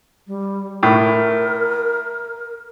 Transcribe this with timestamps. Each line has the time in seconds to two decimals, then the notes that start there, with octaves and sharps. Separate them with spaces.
0.27 G3
0.83 A2 A#4